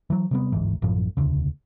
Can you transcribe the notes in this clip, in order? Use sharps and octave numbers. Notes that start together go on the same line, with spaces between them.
E3 F#3
C3 G3 B3
G1 D2 G#2 E3
A1 F#2 A2 F3
E1 D2 C#3